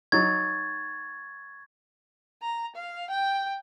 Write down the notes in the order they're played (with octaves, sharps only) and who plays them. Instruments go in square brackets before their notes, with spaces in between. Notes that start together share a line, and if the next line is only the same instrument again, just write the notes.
[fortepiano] F#3 D#4 [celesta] C#6 A6 [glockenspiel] G#6
[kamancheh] A#5
F5
G5